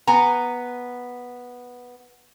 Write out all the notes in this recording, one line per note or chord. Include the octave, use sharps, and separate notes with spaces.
B3 G#5 A#5